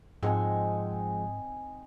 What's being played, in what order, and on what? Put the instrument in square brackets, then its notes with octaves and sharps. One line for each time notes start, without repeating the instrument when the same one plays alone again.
[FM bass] G#2 [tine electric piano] F3 G#3 F#5 [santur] C4 D#4 G#5